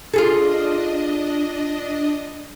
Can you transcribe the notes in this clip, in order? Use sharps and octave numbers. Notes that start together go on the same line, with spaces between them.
D4 F4 G#4 A4 D#5